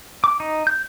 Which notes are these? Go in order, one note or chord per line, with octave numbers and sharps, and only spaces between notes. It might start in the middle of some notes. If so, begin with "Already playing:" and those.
D6
D#4
G6